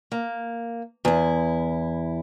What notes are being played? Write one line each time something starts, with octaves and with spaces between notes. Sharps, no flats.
A#3
E2 E4